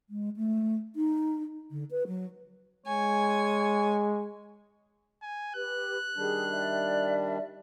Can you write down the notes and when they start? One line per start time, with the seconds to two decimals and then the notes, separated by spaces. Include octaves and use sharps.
0.10 G#3
0.37 A3
0.96 D#4
1.71 D3
1.91 B4
2.07 F#3
2.86 G#3 C#5 G#5
5.22 G#5
5.55 G4 B4 F#6
6.17 D#3 G3 D4 G#4
6.52 D5 E5